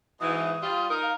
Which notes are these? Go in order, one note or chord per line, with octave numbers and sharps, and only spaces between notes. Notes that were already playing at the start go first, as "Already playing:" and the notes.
G#2 B2 E3 D#6
D#6
G3 F4
D#4 A#4
F5